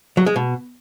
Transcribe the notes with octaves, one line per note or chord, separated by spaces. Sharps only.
F#3
G#3
B2